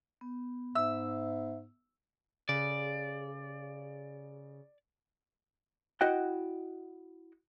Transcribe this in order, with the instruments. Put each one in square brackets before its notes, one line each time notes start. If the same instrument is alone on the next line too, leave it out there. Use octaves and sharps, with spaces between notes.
[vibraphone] B3
[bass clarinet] G#2 [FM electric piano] E5 [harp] E6
[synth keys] C#3 [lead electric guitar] D5
[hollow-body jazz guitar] E4 F#4 D#5 F#5 G5